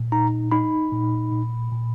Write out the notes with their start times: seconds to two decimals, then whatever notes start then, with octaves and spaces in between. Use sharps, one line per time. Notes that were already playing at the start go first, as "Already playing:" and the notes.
Already playing: A#2
0.12 D#4 A#5
0.52 D#4 B5
0.92 A#2
1.32 A#2
1.72 A#2